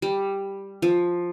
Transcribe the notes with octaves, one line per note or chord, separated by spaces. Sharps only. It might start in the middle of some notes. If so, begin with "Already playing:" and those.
G3
F3